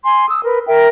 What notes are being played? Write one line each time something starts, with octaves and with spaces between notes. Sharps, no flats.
G#5 C6
D#6 E6
A#4 B4
A#4 E5 G5